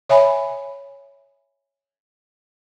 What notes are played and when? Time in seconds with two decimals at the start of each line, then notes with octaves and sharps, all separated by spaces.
0.09 C#5 E5 G#5 B5